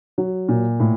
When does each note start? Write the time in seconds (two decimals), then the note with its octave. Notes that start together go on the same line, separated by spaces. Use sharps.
0.18 F#3
0.49 A#2
0.80 A2